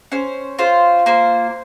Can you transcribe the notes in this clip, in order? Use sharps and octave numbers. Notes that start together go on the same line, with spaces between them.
C#4 C5
F4 C5
A#3 C5